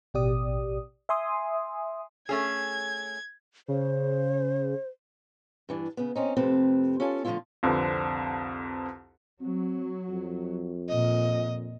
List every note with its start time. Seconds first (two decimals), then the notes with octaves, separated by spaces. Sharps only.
0.14 A1 B2 G4 D5 D#6
1.09 E5 G#5 C6 D#6
2.29 A3 C#4 G#4 G#6
3.68 C#3 C5
5.69 G2 E3 D4
5.97 C#3 B3
6.15 C4 C#4 D#4
6.37 F2 C3 A3 C4 B4 A5
7.00 C#4 F4 A4 G#5 A5
7.25 D3 F3 F#3 A3 E4 F4
7.63 C2 F2 D3 C4 B4
9.41 F#3 C4
10.10 F2
10.89 A#2 D#5